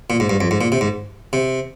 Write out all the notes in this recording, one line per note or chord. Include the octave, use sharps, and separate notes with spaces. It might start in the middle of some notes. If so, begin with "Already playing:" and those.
A#2
G#2
G2
F2
G#2
A#2
C3
G#2
C3